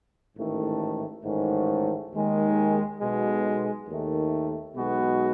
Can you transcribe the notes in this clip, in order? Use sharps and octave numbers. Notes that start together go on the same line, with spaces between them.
A1 G#2 D#3 A3
A1 G#2 D#3 A3 C#4
D#2 D#3 G#3
B1 B2 G#3
D#2 D#3 A3
B1 B2 G#3 B3 F#4